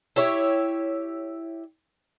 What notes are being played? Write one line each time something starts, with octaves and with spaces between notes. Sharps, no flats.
E4 G4 C#5 E5